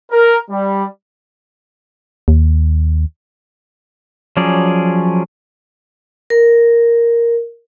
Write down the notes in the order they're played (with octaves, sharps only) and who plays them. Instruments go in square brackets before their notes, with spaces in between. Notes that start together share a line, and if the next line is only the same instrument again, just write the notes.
[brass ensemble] A#4
G3
[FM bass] D#2
[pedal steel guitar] F3 F#3 C#4 G#4 D5
[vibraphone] A#4